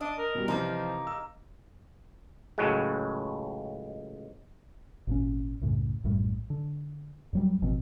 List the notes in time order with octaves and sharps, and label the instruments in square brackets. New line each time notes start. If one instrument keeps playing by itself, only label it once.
[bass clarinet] D4 [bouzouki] D#5
[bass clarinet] A#4
[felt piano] B2 G3
[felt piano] C3 E3 [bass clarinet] F3 [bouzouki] A#3 D#4
[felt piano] E6
[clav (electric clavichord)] C#2 A2 F#3 G#3
[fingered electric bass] G#1 A#2 C#4
C2 F#2 A2 C#3
A#1 F#2 A2 G3
D3
F2 F#3 G3
G#1 B2 F3 C4